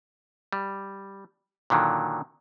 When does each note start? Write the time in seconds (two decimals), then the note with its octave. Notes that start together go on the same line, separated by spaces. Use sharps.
0.53 G3
1.70 A#2 D3 D#3 F#3